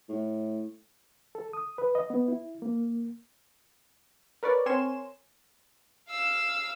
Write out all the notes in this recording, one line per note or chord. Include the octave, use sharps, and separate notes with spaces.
A2
A4
D#6
B4
D#5
B3
E4
A#3
A#4 B4 C#5 D5
C4 A#4 C#5 G#5 C6 E7
F5 E6